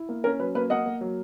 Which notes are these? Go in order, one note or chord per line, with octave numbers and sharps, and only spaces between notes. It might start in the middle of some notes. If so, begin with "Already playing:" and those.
Already playing: E4
A#3
C#4 A#4
F#3 B4
A#3 B4
A#3 D#5 F#5
A#3
F#3